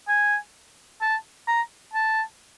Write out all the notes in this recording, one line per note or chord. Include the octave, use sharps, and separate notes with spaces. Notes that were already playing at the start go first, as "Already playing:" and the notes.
G#5
A5
A#5
A5